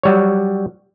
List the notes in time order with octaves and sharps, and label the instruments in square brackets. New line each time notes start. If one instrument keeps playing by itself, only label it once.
[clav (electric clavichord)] F#3 G3 C#5